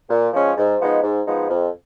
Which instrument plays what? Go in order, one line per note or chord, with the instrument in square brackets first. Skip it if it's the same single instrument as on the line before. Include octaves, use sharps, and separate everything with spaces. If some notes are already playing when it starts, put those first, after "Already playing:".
[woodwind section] A#2
F3 G#3 C#4
G#2
F3 G#3 B3 D#4
G#2
F3 G#3 B3 D#4
F2